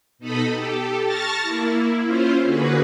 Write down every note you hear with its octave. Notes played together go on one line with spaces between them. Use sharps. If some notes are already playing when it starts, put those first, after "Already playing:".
B2 D#4 A4 D#5 B5
G4 A4
A5 C#6 F6 A6 A#6
A#3 E4
C#4 E4 F4 C5
D3 A#3 F#4 G#4 B4